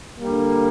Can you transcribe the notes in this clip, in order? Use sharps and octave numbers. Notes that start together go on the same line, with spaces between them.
D3 G3 A#3